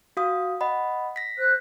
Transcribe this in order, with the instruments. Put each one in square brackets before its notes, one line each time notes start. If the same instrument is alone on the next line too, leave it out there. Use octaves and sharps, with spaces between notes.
[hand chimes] F#4 F5 D#6
D#5 F#5 B5
A#6 B6
[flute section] C5 F#6